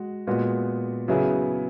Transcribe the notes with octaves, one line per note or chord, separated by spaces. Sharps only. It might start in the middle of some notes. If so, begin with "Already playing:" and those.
Already playing: G#3 F#4
A#2 G#3 B3 F#4
C#3 F#3 B3 E4 G#4